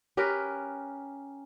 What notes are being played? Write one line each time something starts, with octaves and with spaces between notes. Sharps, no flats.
C#4 G4 A#4 B4